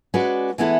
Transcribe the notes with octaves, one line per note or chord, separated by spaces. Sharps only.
G#3 C#4 F#4 B4 D5
E3 G#3 B3 E4 A4